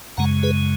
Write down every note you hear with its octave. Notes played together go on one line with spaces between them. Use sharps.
F#2 C#3 G#3 F#5 A#5
G#4 B4